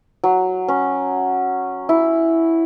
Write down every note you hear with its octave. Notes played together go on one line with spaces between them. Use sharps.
F#3
C#4
E4